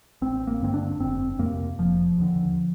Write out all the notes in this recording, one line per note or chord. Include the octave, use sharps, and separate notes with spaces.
A1 C4
A#3
G2 D3 C4
D4
F1 C4
F2 C3 A#3
F1 F3
D#2 D3